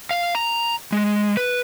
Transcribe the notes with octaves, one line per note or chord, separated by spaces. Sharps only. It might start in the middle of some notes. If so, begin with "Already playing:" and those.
F5
A#5
G#3
B4